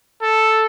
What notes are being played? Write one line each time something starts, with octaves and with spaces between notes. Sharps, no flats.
A4